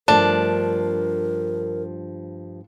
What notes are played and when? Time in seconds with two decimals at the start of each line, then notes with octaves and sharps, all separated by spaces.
0.08 G2 F3 A3 D4 A#4